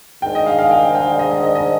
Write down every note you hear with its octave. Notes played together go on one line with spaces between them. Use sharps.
G#2 D#3 G#3 D4 G5
D#5
F5
F5
G5
G5
D#5
D#5
D#5
D#5